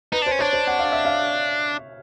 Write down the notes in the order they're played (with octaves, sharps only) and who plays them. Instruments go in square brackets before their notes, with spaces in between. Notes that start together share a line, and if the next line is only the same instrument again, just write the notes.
[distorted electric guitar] D#4 [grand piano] B4
[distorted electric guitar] D4
[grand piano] C5
[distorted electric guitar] C#4
[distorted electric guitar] D4 [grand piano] C#5
[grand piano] C5
F#5
F5
E5
F5